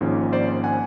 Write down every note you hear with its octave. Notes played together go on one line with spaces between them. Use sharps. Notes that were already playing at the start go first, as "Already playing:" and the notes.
G#1 G#2 F3 A#3 C#4
C5 D5
F#5 G#5